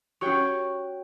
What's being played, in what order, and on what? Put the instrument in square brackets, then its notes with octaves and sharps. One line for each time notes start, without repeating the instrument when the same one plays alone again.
[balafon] C#4 G4 [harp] F#4 C#5 G5 [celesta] C#6